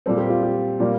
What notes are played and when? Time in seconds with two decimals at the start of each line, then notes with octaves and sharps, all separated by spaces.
0.06 A#2 G3 C4 A4
0.18 G4
0.30 F4
0.42 G4
0.80 A#2 G3 A#3